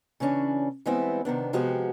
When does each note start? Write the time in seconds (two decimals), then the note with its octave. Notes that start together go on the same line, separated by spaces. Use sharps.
0.20 C#3 E3 C#4 D4
0.86 E3 G3 G#3 B3 C4 E4
1.25 C3 D#3 B3 D4
1.53 C3 F3 G#3 B3 F#4 G4